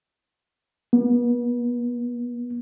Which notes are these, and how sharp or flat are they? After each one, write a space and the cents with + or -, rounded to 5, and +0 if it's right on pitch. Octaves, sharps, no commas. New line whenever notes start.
B3 -40